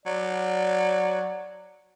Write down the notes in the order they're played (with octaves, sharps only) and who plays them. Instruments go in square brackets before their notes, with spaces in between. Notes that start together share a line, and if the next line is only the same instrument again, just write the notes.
[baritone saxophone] F#3 [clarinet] D5